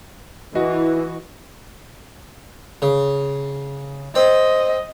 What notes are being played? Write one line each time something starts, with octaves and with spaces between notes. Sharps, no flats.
E3 F#4 D#5
C#3
C4 D#5